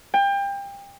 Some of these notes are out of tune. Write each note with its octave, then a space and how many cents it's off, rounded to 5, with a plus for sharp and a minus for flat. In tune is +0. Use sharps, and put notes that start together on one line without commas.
G5 +30